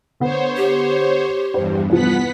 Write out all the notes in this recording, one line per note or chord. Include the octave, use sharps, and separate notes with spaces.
D3 B3 C5 C#5
G4
E2 G2 C5
C2 F3 B3 F#5 B6